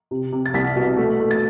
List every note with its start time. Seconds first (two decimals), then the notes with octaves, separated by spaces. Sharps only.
0.11 C3
0.32 C3
0.46 A6
0.54 C2 B6
0.76 B2
0.97 A3
1.20 A3
1.31 A6